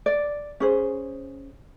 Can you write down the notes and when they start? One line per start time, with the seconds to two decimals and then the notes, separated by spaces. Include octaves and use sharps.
0.06 D5
0.60 C#4 G#4 C5